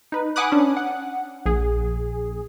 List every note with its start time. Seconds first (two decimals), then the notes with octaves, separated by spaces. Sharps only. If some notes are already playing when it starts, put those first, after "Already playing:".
0.12 D#4 B4
0.36 F#5 G#5 B5 D6 D#6 F#6
0.52 C#4 D4
0.77 F#5
1.46 A#1 G#4